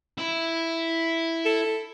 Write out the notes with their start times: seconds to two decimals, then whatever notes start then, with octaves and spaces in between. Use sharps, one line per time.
0.18 E4
1.46 A4